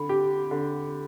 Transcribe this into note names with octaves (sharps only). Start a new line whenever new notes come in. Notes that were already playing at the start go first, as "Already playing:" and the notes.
Already playing: D3 B5
G4
D3